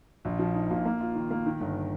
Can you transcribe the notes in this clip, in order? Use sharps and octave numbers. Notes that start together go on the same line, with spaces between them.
A#1
F3
D#4
A#2
A#3
F4
D#3
A#3
D#3
G1